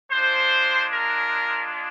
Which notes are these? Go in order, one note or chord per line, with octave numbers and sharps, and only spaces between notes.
G#3 D4 F4 C5
A#4